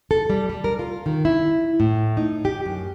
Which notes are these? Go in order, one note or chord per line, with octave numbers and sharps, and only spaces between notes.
A4
G3
G3
A#4
F4
D#3
E4
A2
D#4
G4
F#2